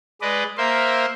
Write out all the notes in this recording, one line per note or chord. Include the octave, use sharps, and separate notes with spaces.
G#3 B4 D5 D#5
A#3 A#4 C5 E5 C6